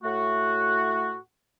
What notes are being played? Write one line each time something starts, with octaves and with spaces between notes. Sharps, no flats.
A2 A3 F#4